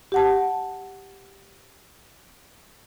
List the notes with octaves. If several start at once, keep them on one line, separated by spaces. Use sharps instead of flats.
G4 F#5 A5